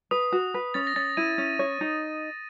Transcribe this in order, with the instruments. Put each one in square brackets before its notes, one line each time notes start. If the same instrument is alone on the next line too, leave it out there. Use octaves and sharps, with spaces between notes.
[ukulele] B4 [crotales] D#6
[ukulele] F#4
B4
[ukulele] C#4 [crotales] A6
[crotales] A#6
[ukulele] C#4 [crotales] A6
[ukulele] E4 [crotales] D#7
[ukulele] C#4
C#5
D#4